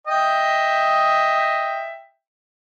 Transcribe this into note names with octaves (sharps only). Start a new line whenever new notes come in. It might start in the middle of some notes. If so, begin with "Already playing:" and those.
D#5 E5 G5